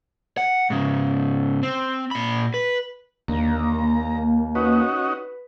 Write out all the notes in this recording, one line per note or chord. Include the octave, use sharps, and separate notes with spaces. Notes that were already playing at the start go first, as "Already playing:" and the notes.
F#5
G#2 C#3
C4
A#2 B5
B4
D#2 D3 A#3 A#5
C#4 D#4 F#4 B4